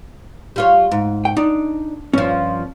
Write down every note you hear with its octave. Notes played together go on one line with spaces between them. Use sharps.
G3 F4 C#5
G#2
G5
D4 D#4
G2 F3 C#4